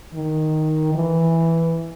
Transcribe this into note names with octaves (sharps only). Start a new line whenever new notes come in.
D#3
E3